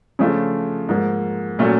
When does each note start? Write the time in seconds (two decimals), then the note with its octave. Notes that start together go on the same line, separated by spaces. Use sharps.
0.19 C#3 F3 A3 D4 F4
0.89 G#2 F3 A#3
1.59 A#2 F#3 A3 C#4